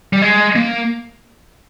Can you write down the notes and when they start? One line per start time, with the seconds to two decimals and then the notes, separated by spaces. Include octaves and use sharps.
0.13 G3
0.22 G#3
0.56 A#3